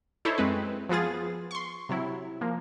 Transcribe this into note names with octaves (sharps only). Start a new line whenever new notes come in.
D#4 E4 A4 C5 C#5
F#2 G#3 C4 B4
F3 B3 F4 G#4 A6
C6 C#6
C3 F#3 E4
F3 A#3